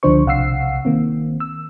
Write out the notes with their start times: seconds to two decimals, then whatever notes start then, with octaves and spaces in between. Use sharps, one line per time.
0.03 C#2 D3 F3 D4 C5 C#6
0.26 B1 C3 F5 F#5 E6 C7
0.85 D#3 A#3 C4
1.40 E6